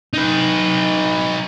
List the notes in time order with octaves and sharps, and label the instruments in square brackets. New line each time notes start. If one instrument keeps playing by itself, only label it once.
[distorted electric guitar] D#4 B4